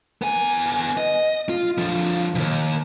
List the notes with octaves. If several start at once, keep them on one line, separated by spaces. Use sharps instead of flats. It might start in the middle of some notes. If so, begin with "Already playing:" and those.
B3 G#5
D#5
F4
D3 F3
D#2 B2